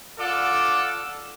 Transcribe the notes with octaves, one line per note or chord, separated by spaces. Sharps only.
F4 A4 D5 F#5 D6